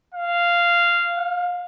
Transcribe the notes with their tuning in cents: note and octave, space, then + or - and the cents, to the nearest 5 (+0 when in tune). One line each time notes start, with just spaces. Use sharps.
F5 -10
F5 +30